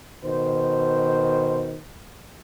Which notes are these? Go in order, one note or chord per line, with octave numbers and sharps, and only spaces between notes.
B2 D#3 C5